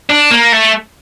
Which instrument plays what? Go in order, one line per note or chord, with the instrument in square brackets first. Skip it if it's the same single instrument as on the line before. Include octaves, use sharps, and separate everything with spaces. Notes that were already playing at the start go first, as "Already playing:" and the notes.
[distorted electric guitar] D4
A#3
A3